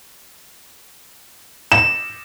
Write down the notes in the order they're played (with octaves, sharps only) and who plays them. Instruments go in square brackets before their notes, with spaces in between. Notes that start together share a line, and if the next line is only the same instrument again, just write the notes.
[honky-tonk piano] E7